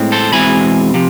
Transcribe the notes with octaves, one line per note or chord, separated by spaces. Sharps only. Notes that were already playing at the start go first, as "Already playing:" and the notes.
Already playing: A2 G#3 C4
A4 C5
E2 B2 G#3 C4 G#5 B5
C3 F3